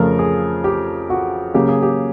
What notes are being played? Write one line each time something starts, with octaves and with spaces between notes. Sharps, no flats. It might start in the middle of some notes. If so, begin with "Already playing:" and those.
Already playing: F2 C#3 F3 A3 A#4
G#4
G4
F#4
C#3 F#3 A#3 G4
G#4
G4